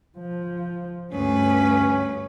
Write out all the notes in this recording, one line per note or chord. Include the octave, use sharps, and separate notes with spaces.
F3
D2 G2 C#4 B4